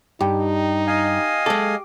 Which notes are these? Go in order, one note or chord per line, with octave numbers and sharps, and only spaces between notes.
G2 D#4 G4
D#5 F5 G#5
G#3 A4 D6